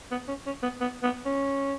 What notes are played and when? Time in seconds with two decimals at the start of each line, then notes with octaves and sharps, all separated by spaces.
0.11 B3
0.28 C#4
0.46 C#4
0.63 B3
0.80 B3
1.03 B3
1.26 C#4